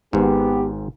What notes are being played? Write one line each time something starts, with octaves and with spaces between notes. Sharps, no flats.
G#1 G#2 B3 G4